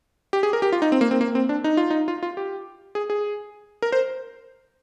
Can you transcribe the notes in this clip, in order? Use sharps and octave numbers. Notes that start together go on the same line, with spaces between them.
G4
G#4
A#4
G4
F4
D#4
C4
A#3
C4
A#3
C4
D4
D#4
F4
D#4
F4
F4
G4
G#4
G#4
A#4
C5